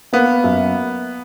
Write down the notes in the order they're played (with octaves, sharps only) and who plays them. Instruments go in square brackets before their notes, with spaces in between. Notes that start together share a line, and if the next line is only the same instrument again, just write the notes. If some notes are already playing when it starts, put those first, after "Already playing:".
[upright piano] A#3 [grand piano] B3
[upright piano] F#2